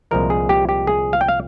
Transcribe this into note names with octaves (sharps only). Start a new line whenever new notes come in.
C2 A#2 F3 G#3 A#4
G#4
G4
G4
G#4
F5
G5
F5